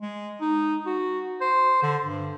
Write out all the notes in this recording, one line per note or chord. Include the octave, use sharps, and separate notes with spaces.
G#3
D#4
F#4
C5
D3
G2